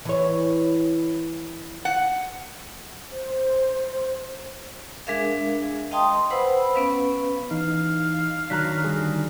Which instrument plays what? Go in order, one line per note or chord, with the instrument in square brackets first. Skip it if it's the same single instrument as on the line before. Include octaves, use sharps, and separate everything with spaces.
[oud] E3 C#5
[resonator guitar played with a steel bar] F#5
[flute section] C5
[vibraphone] G#3 D4 G#4 A#4 E5 F5
D#5 F5 G5 A5 C6 D#6
B4 C5 F#5 B5 E6
B3 C#4 B4 F5
[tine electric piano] E3 D#4 [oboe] F5
[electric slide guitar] D#3 F#3 D4 [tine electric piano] A#5 F#6 B6
[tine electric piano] D3 G3 G#4